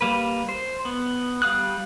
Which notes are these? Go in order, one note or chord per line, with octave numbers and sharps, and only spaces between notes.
G3 A#3 B4
C5
B3
G3 F5 D#6 F#6